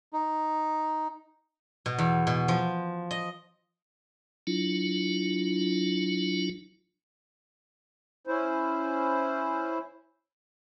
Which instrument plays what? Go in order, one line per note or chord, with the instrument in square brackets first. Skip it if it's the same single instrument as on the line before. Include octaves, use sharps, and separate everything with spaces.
[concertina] D#4
[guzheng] B2
E2
B2
F3
D#5
[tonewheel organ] F#3 D4 E4 F4
[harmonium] C#4 E4 C5